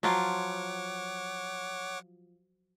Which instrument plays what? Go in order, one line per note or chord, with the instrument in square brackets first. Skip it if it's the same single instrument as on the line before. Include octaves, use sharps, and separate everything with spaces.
[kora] F3 F#3 F4 [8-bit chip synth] C#5 F#5 D6